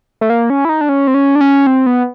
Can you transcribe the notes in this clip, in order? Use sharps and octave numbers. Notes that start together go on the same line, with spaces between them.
A3
A#3
C#4
E4
D#4
D4
C#4
C4
C#4
D4
C#4
C4
B3